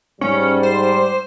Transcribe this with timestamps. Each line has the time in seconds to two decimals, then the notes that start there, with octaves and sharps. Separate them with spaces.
0.21 G#2 G3 C#4
0.63 C5